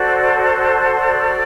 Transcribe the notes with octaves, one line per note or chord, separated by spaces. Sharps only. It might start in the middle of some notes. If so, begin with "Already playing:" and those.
Already playing: F#4 A4 C5 D5
D5